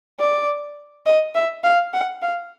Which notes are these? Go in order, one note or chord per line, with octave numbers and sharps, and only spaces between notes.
D5
D#5
E5
F5
F#5
F5